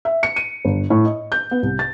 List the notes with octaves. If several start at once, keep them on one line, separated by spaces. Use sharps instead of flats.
E5
C#7
D#7
G1
A2
D#5
G6
B3
C2
A6